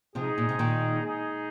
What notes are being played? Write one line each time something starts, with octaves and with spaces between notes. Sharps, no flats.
C3 F3 G#3 D#4 G#4
A#2
C3
A#2 D#3
G#3 D#4 G#4